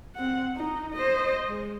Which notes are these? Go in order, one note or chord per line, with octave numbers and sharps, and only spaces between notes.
C4 F#5
D#4
C5 D#5
G#3